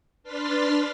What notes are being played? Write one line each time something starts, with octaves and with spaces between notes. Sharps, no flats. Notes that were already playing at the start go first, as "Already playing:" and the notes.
D4 B4 C6 F6 A6 B6